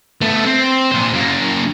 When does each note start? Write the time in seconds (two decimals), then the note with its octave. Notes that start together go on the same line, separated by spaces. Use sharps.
0.21 A3 B3
0.46 C4
0.92 A#2 C5
1.13 F#2 A#3